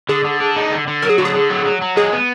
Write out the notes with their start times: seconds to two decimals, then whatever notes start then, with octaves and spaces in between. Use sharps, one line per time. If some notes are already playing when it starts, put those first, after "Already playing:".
0.09 D3 G#4
0.25 D3
0.40 D4
0.56 D#4
0.71 D3
0.87 D3
1.02 F#3 A#4
1.10 G#4
1.18 D3 F#4
1.25 G#4
1.34 D3
1.50 F#3
1.65 F#3
1.81 F#3
1.96 G#3 G#4
2.13 B3